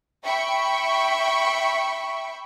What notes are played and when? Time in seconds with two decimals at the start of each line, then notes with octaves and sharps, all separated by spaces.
0.25 E5 G5 B5 C#6